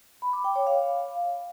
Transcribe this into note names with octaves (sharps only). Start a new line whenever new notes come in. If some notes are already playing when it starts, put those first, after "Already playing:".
B5
D6
G5
C#5
F5